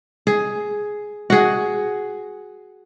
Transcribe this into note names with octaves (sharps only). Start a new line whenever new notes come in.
G#4
F#4 G#4